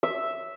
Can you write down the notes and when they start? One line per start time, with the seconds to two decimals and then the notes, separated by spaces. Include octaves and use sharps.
0.03 E5